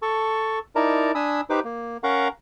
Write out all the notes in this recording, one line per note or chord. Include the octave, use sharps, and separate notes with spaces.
A4 A5 C#6
D#4 E4 A#4 D5 A5 A#5
D4 G#5 B5 D#6 E6
D#4 G4 B4 C5 D6
A#3
C#4 A#4 F5 F#5 A#5 C#6